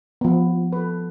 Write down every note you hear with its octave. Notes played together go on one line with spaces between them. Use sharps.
F3 B3
A4 B4